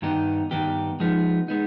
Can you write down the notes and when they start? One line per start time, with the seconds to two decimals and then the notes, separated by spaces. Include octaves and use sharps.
0.02 G2 D#3 B3 D#4 G4
0.51 G2 D#3 B3 D#4 G4
1.00 F3 G#3 B3 D#4
1.48 G#3 B3 D#4